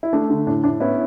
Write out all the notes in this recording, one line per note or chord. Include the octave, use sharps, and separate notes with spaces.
E4
A3 D4
D3
A2 D4
A2 D4
B3 C#4 E4